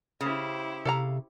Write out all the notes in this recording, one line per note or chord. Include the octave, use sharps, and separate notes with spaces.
C#3 E4 G4 C5
C3 A4 F5 A#5